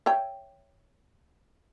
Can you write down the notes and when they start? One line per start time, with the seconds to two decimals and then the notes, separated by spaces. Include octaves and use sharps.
0.06 C#5 E5 G5